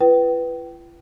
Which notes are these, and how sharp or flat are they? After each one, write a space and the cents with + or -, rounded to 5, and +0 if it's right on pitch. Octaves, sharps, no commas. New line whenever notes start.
F4 -40 B4 +0 G5 -30